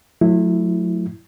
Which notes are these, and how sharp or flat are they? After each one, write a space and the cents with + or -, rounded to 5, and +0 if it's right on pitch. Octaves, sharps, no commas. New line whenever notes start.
F#3 -40 A3 -20 E4 +0